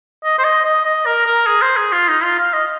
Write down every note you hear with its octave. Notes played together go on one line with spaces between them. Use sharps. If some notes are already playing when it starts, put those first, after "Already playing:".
D#5
C5
D#5
D#5
D#5
A#4
A#4
G#4
C5
G#4
F4
D#4
F4
F5
D#5